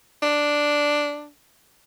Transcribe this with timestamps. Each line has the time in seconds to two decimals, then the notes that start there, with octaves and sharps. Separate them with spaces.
0.22 D4